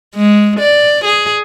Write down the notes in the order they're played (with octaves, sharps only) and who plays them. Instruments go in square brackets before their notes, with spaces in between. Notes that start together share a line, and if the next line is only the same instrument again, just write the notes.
[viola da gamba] G#3
D5
G#4